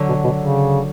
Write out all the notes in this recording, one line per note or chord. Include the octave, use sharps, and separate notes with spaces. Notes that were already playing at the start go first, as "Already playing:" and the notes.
Already playing: D3 F#3
B2
B2
C#3